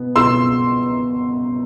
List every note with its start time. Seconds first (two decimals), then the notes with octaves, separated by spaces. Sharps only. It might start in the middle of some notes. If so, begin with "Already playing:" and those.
Already playing: B2 B3
0.16 B2 B3 F4 G#4 C6 E6